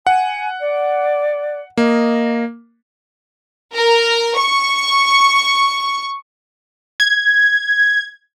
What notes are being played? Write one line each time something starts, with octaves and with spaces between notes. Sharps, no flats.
F#5 G#5
D5
A#3 D#5
A#4
C#6
G#6